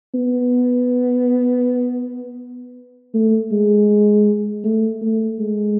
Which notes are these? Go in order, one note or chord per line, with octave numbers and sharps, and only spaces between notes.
B3
A3
G#3
A3
A3
G#3